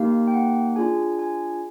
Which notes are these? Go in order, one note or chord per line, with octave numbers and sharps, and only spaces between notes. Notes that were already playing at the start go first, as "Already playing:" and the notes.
Already playing: A#3 D#4 G4 F5
G5
F#5
D4 F4 G#4 G#5
G#5